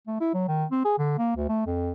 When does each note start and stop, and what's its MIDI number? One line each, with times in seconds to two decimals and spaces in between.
0.07 0.17 57
0.20 0.31 64
0.34 0.46 54
0.48 0.65 51
0.71 0.82 60
0.84 0.97 68
0.98 1.17 50
1.18 1.33 58
1.36 1.48 38
1.49 1.66 57
1.66 1.92 41